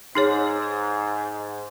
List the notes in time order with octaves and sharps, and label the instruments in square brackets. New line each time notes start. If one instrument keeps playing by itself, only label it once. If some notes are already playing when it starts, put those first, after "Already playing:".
[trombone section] G#2 [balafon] D#4 G#4 C#5